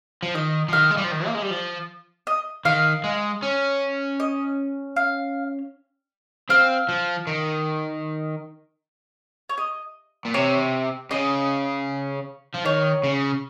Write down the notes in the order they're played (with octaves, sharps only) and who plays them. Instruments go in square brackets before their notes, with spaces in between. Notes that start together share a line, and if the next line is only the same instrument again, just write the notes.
[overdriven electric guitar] F3
[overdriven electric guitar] D#3 [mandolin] D#5
[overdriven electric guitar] F3
[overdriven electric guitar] D#3 [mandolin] F5
[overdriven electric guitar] G#3
G3
F3
D#3
A#3
G#3
G3
F3
[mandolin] D#5
[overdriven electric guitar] D#3 [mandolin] F5
[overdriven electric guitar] G#3
C#4
[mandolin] D#5
F5
[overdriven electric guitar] C4 [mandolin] F5
[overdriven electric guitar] F3
D#3
[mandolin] C#5
D#5
[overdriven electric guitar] A#2
[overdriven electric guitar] C3 [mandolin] C#5
[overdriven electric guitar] C#3 [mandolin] D#5
[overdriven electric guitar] F3
[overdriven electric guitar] D#3 [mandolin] C#5
[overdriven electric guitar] C#3